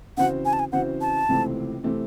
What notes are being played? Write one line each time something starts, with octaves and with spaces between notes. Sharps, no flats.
C#3 E3 C4 F#4 C5 F#5
G#5
A5
G#5
C#3 E3 C4 F#4 C5 F#5
A5
C#2 C3 E3 A3 C4
C3 E3 A3 C4